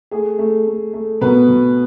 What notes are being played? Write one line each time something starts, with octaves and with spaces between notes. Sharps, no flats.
A3 G#4
A3
A3
A3
B2 B3 B4
B2